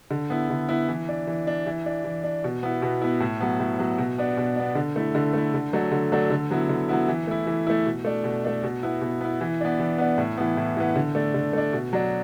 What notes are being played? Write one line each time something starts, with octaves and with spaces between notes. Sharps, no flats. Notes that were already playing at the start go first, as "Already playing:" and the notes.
D3
B3 E4
D3
B3 E4
E3
D4
E3
D4
E3
D4
E3
D4
B2
B3 E4
B2
B3 E4
A2
F#3 B3
A2
F#3 B3
B2
B3 D4
B2
B3 D4
D3
A3 E4
D3
A3 E4
D3
F#3 A3 D4
D3
F#3 A3 D4
D3
F#3 B3 E4
D3
F#3 B3 E4
E3
A3 E4
E3
A3 E4
B2
A3 D4
B2
A3 D4
B2
B3 E4
B2
B3 E4
E3
B3 D4
E3
B3 D4
A2
E3 B3
A2
E3 B3
D3
A3 D4
D3
A3 D4
B2
F#3 D4